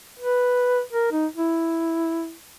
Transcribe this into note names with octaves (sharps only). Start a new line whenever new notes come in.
B4
A#4
D#4
E4